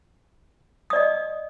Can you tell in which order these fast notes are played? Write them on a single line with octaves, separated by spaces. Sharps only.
D#6 D5 D#5